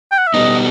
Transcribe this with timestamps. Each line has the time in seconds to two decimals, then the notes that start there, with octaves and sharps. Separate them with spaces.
0.11 G5
0.18 F#5
0.27 E5
0.34 B2 G3 B3 D#4 D#5